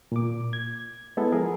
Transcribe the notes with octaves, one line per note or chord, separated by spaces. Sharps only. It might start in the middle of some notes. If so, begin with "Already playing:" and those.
A#2 D6
G#6
G#3 B3 E4 A4
F3 G#4 A#4